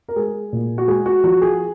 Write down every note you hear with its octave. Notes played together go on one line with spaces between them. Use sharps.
A#4
G#3 G#4
A#2
F#4
G#3 G#4
F#4
F3 F#4
G#4